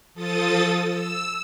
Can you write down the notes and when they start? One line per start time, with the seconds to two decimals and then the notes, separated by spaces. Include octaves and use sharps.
0.14 F3 A4 D#6 A6
0.87 E6